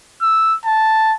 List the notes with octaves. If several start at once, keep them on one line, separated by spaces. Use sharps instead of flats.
E6
A5